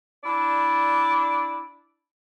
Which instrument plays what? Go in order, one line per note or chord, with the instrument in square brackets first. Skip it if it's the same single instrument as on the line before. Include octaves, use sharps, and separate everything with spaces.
[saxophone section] D4 E4 D5